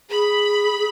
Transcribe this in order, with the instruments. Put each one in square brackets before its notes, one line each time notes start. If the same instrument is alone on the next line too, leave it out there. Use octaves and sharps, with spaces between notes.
[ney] G#4 [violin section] B5